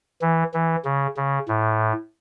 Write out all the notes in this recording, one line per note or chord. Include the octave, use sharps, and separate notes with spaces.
E3
E3
C#3
C#3
A2